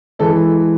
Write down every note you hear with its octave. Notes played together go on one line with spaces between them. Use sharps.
E3 G#3 A4